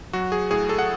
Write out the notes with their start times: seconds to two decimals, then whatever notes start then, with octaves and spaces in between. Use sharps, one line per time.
0.13 F#3 F#4
0.32 G#4
0.51 A2 G#4
0.69 A4
0.78 F#5